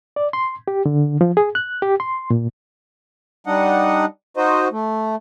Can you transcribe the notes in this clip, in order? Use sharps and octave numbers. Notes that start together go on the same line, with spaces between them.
D5
C6
G4
D3
F3
G#4
F#6
G4
C6
A#2
G3 D4 D#4 D#5 F#5
D#4 F#4 C5 D#5
A3